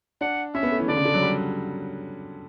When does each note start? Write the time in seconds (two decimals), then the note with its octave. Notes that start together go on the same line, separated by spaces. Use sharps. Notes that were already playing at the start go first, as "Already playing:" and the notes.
0.21 D4 F#5
0.55 C#4 E5
0.63 B3
0.72 A3
0.79 E3
0.88 D3 D5
0.97 C#3
1.05 D3
1.14 F#3
1.22 G3